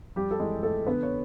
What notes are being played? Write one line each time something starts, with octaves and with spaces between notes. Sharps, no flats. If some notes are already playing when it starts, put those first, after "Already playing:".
F2 G3 G4
A4
E3 G#3 G#4
F2 A3 A4
D3 B3 B4
C#5